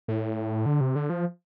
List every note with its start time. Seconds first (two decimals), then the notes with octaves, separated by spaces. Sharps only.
0.08 A2
0.66 D3
0.81 C3
0.96 D3
1.10 F3